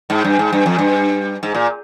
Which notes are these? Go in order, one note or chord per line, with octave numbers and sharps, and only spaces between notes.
G#2
G2
G#2
G2
F2
G2
G#2
A#2